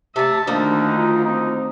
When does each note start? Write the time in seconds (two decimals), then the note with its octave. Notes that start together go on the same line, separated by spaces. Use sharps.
0.16 C3 A3 E5 A5
0.47 D2 D3 D#3 F3 A#3 D4 D#4
0.96 F4
1.25 C4 D#4